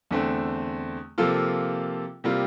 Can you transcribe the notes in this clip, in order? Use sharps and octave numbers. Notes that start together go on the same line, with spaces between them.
E2 D3 A3 C4
C3 F3 A#3 F4 A4
C3 G3 A#3 F4